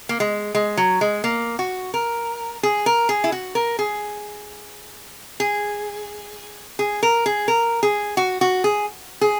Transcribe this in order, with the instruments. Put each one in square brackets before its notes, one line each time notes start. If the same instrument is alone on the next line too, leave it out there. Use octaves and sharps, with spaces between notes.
[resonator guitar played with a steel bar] A#3
G#3
G#3
F#3
G#3
A#3
F#4
A#4
G#4
A#4
G#4
E4
F#4
A#4
G#4
G#4
G#4
A#4
G#4
A#4
G#4
F#4
F#4
G#4
G#4